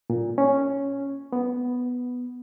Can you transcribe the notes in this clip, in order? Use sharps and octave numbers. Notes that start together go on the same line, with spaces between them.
A#2
C#4
B3